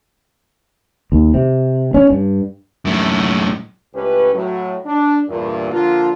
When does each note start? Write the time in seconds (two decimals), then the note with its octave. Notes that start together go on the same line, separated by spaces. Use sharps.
1.12 D#2
1.34 C3
1.94 C#4
2.11 G2
2.85 F#2 A2
3.94 C#2 A2 C#4 G4 B4
4.33 A2 F#3
4.85 D4
5.28 E2 G2 A#2
5.71 D3 F3 A#3 D4 F4